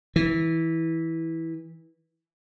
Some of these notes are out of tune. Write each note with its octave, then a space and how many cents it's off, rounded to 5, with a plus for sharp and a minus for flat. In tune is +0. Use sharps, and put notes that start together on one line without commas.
E3 -15